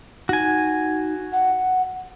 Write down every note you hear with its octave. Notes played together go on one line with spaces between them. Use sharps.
D#4 F#4 G#5
F#5